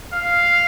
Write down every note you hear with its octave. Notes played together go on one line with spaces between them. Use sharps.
F5